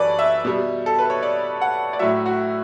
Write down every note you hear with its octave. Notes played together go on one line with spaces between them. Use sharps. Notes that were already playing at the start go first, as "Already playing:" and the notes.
Already playing: F#2 E3 G3 A4 B4 C#5 D5
E5
B2 G3
A4
B4
C#5
D5
F#5
D5
A2 F#3 E5
F#4